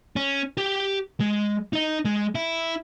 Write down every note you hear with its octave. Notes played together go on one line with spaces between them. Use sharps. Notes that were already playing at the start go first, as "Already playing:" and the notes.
C#4
G4 G5
G#3
D#4 D#5
G#3
E4